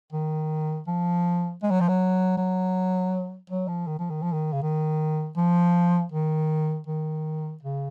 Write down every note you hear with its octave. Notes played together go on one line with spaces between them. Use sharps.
D#3
F3
G#3
F#3
F3
F#3
F#3
F#3
F3
D#3
F3
D#3
F3
D#3
C#3
D#3
F3
D#3
D#3
C#3